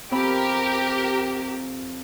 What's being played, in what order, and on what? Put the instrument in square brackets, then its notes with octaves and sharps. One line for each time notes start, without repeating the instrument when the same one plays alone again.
[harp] F2 C4 B5 [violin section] G4 A#4